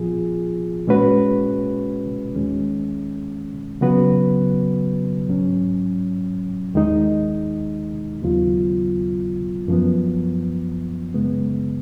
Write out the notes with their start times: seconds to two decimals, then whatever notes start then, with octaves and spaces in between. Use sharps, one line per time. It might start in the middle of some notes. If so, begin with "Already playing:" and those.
Already playing: A#2 F3 B3 F4 G#4
0.88 A#2 G#3 C#4 F#4 B4
2.35 D#2 D#3 G#3 C#4
3.81 C#3 F#3 B3 F#4 B4
5.28 G#2 F#3 C#4
6.74 D#2 D#3 G#3 D#4
8.22 D#2 C#3 F#3 B3 F4
9.68 F#2 F3 B3
11.14 F#2 C#3 G#3 B3